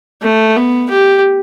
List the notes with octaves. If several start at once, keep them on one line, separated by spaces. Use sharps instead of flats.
A3
B3
G4